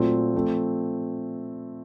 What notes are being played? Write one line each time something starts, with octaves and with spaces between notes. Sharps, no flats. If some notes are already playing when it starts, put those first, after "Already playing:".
Already playing: A#2 F#3 A3 C4 F4
F3 A3 C4